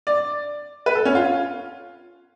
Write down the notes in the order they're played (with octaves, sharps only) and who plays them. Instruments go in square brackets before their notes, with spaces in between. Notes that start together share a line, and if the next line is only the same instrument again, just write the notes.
[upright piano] D5
B4
A4
C#4
F4